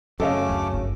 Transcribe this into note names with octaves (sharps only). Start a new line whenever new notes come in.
F#2 C#3 A3 C#4 A4 D#5 F5 D6
D2
G1 D#4